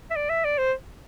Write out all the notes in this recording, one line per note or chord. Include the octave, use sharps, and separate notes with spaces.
E5
D5
E5
D5
C5